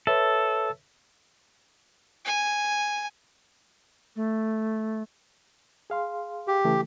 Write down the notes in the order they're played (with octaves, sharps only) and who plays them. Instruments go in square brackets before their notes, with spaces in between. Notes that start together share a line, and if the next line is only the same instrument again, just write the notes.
[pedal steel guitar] A4 [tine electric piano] B4 C#5 E5
[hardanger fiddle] G#5
[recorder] A3
[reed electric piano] G#4 F5 C6
[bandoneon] G4
[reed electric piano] C#3 E3 A3